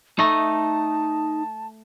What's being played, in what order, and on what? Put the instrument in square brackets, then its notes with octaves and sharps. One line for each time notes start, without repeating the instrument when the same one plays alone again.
[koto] A3 [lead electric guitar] D#4 A#5 [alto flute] A5